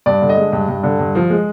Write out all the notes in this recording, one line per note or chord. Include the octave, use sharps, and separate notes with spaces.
G2 D5
D3
D#5
G#3
G2
G2
D3
G2
F3
G#3